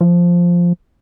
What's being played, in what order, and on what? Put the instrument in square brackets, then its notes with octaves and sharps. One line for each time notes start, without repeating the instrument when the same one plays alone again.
[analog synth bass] F3